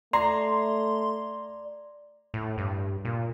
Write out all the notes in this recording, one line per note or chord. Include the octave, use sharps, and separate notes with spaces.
A3 D5 A#5 C6
A2
G2
A#2